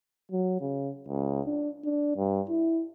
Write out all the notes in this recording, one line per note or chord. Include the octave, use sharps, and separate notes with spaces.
F#3
C#3
C#2
D4
D4
G2
E4